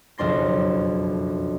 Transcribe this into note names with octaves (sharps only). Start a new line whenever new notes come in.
F#1 B1 F2 D4 C6 A#6